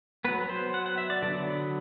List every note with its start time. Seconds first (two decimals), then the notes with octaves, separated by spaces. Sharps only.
0.25 F#3 B3 B4
0.49 C5
0.74 F#5
0.86 F#5
0.98 E5
1.10 D5
1.22 D3 F#3 B3 D5